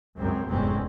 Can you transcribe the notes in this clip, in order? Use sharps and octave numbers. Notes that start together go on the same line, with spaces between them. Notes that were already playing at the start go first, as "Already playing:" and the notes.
C#2 F#2 C4
F1 E2 G#2 G#3 C4 C#4